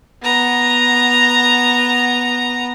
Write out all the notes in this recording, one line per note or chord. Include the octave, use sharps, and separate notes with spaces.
B3 A#5